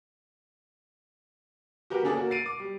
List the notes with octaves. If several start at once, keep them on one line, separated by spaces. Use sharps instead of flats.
F#4 G4 A#4 B4
D3 A#3 C#4 D4 G#4 A4
A#3 F#4
A6 C7 D7 D#7
D6
G3